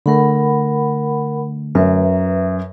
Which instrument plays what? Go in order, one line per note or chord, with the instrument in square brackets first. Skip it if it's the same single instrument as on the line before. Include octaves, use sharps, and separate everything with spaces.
[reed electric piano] D3 A3 [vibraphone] A#4 F#5 B5
[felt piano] F#2 [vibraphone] B4 E5